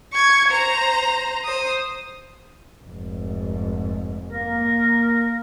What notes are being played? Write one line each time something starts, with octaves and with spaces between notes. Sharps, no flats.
C#6 G#6
C5 A#5
C5 D#6
F1 G#2
A#3 A#4